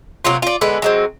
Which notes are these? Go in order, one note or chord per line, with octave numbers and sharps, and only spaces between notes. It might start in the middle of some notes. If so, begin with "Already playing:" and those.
C3 F#3 A#3 F4
F4 D5
D3 G#3 B3 B4
F#3 G#3 C4